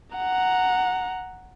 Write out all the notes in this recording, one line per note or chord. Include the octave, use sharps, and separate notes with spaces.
F#5 A#5